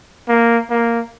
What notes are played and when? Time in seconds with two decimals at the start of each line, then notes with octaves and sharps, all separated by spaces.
0.28 A#3
0.70 A#3